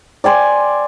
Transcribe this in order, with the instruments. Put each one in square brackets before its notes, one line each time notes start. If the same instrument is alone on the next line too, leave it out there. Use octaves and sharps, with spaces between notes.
[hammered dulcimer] D5 G5 G#5 C6